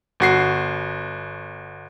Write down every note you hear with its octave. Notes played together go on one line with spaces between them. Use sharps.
G1 F#4 C7